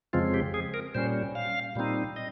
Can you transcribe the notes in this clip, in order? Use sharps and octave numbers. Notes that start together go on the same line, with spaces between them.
F2 C#3 F3 G#3 C4 F4
G4
G#4
A#4
A#2 G3 C#4 C5
F5
A#2 G3 C4 D#4
D#5